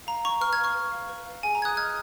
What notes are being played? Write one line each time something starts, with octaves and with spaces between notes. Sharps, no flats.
F5 A#5
F5 A#5 C#6
B4 C#6 F6
F6 G#6
F5
C#6 F6
B4
F5
B4
F5
G#4 G#5
A#5
G#4 D#6 F#6 G#6
D#5 F6 G#6